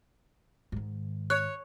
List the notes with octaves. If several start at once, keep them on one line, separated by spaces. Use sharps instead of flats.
G#2 D#3
C#5 F#6